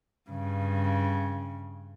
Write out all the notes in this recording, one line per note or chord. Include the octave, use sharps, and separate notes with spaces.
G2 C#3